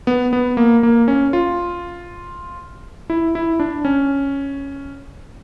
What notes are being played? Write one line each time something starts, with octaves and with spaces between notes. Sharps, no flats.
B3
B3
A#3
A#3
C#4
F4
E4
E4
D4
C#4